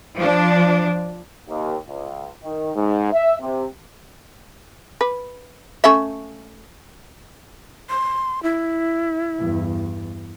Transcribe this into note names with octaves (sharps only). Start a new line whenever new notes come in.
F3 D4
D#2
C#2
D#3
G#2
E5
C3
B4
A3 C#4 E5
C6
E4
E2 G2